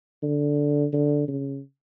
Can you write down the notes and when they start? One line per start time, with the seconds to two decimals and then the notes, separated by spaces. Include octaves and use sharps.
0.23 D3
0.93 D3
1.28 C#3